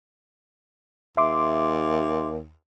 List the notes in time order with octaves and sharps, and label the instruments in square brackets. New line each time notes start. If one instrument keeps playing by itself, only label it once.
[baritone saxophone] D#2 [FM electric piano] E5 C6 D6